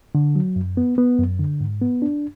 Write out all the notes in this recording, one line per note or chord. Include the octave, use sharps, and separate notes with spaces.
D3
F#3
F#2
B3
B3
F#2
D3
G#2
B3
D4